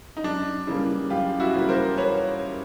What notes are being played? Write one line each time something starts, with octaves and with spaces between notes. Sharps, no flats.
D#4
F#2 D4
C#3 E3 G3 A#3
F#2 F4 G4
E4 F#4
C#3 E3 G3 A#3
A#4 C5
B4 C#5